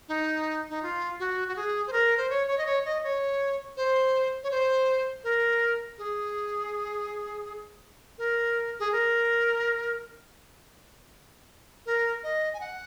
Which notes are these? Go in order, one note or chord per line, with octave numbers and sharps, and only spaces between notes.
D#4
D#4
F4
F#4
F#4
G#4
C5
A#4
C5
C#5
C#5
D#5
C#5
D#5
C#5
C5
C#5
C5
A#4
G#4
A#4
G#4
A#4
A#4
D#5
G#5
F#5